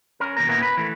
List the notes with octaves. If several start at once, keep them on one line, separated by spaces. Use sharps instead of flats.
C#4 A#4
D#2 B2 A#4
A#2 A#3 B3 C#4 E4 A#4
B4
E3 A3